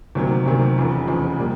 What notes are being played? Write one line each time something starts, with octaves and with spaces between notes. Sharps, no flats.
D2 C3 D#3 F#3 A#3
D2 C3 D#3 F#3 A#3
F1 E2 C#3 F3
F1 E2 C#3 F3
A#2 G3 A#3